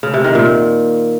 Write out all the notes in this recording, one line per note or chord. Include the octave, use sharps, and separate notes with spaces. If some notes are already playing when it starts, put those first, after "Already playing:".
C#3
C3
D#3
A#2